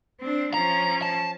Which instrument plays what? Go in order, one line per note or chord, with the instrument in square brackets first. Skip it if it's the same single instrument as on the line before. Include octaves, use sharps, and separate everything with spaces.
[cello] C4 D4
[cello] F3 C#4 [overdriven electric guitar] A#5
[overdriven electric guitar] A5